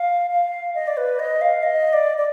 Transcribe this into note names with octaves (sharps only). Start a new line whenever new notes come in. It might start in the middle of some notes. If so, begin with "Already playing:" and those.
Already playing: F5
F5
D#5
D5
B4
D#5
F5
D#5
D5
D5